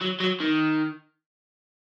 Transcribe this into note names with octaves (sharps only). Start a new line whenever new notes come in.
F#3
F#3
D#3